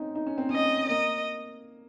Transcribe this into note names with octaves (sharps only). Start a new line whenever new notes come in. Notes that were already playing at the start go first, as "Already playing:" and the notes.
Already playing: C4 C#4 D#4
D#4
C#4
C4
C#4 D#5
A#3 D#5